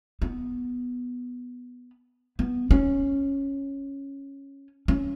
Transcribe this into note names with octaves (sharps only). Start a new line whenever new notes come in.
B3
B3
C#4
C#4